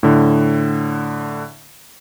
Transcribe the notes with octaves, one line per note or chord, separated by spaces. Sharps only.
A2 D3